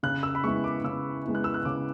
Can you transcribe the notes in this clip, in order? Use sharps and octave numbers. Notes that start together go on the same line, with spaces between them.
C#3 F#6
E6
B5
G#3 B3 E4 C#6
D6
C#3 E6
G#3 B3 E4
F#6
E6
F#6
C#3 D6